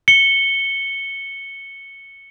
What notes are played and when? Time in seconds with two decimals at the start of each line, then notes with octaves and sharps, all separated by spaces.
0.08 C#7 G7